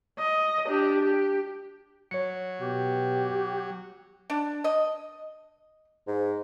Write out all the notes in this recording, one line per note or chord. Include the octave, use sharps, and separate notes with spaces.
D#5
D4 G4
G4
F#3 C#5 C#7
B2 G4
D4
D#5
G#2